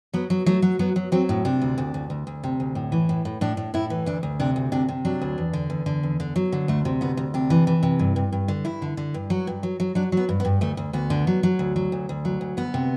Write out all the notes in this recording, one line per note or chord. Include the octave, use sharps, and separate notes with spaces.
F#3 B3
F#3
F#3 A3
F#3
F#3 B3
F#3
F#3 C4
A2
C3 D4
D2
D2
D2
D2
D2
C3
D2
A2
E3
A2
A2
A2 D4
A2
A2 E4
E3
D2 D4
D2
C3 D4
D2
C3 D4
C3
F#3 D4
D2
E2
D3
E2
D3
E2
D3
F#3
D3
D2 A3
C3
D2 B3
D2
C3 D4
E3
E3
C3
G2
G2
G2
D3
G2 E4
D3
D3
G2
F#3 F#4
G2
F#3
F#3
F#3 D4
F#3 B3
G2
B3
G2
D2 A3
D2
D2 B3
D3
F#3
F#3
D2
F#3
D2
D2
F#3
D2
D2 B3
C3